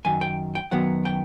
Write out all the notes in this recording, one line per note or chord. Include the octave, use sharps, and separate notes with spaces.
F#2 D#3 G#5
G5
G5
F#2 D#3 F#3 B3 F#5
G5